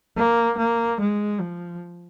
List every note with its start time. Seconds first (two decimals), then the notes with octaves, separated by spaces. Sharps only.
0.17 A#3
0.57 A#3
1.00 G#3
1.40 F3